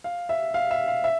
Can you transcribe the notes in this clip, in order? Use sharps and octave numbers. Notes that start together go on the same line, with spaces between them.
F5
E5
F5
E5
F5
E5